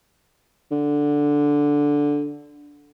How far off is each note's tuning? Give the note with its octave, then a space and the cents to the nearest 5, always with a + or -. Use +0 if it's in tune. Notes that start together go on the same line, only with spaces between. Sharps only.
D3 -5